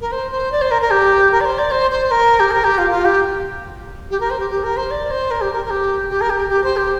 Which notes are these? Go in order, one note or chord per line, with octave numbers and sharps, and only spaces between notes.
A#4
C5
C5
D5
C5
A#4
A#4
G4
A#4
D5
C5
D5
C5
C5
A#4
G4
A#4
G4
F4
F4
G4
G4
A#4
C5
G4
G4
A#4
C5
D5
C5
A#4
G4
A#4
A#4
G4
G4
A#4
G4
G4
C5
G4